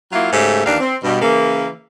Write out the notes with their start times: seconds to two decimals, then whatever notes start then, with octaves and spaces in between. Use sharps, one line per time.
0.12 F#3 A#3 E4 F4
0.33 G#2 C#3 A3 G4
0.66 D#2 E3 D4 F5
0.80 C4
1.03 G2 B2
1.21 C#3 E3 A#3